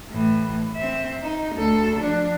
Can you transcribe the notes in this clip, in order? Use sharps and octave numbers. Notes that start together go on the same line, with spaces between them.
A2 E3
C4 E5
D#4
D2 A4
F3 D4